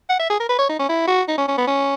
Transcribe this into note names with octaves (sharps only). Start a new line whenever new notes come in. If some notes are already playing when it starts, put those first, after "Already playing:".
F#5
E5
G#4
A#4
B4
C#5
D#4
C#4
E4
F#4
D#4
C#4
C#4
B3
C#4